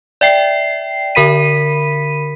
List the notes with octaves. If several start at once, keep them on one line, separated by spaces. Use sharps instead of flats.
D5 E5 G5 C7
D3 A#4 B5 B6 D#7